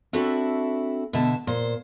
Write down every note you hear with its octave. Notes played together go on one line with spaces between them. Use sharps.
C4 D4 E4 F#4 A4 E5
B2 D3 E5 A5
A#2 C5